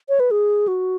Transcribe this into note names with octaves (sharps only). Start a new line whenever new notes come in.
C#5
B4
G#4
F#4